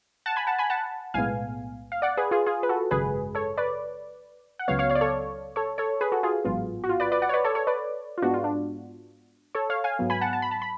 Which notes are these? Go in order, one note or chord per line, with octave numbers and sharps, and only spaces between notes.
F#5 A5
G#5 B5
F#5 A5
G#5 B5
F#5 A5
B1 A2 G#3 B3 F5 G#5
F5
D5 F#5
G#4 B4
F4 G#4
F4 G#4
B4
F#4 A4
G#1 F#2 C#3 G#3 G#4 B4
A4 C#5
B4 D5
F#5
C#2 C#3 F#3 B3 C#5 F5
C#5 F5
C#5 F5
D5
A4 C#5
A4 C#5
A4 C#5
G#4 B4
F#4 A4
F4 G#4
A1 G#2 F#3 B3 F4
F#4
F4
B4 D5
B4 D5
D5 F#5
C#5
B4 D5
A4 C#5
A4 C#5
B4 D5
F4
G#2 G#3 B3 D4 F#4
F4
D4
A4 C#5
C#5 F5
F5 G#5
G#2 F#3 B3
G#5 B5
F#5 A5
A5
B5
A5
B5